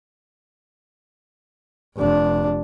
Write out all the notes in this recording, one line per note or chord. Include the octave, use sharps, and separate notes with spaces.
F1 D4